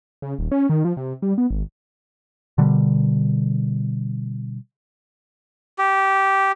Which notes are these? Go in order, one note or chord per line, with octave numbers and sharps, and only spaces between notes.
C#3
D#1
C#4
D#3
F3
C3
G3
B3
G#1
B2 D3 G3
G4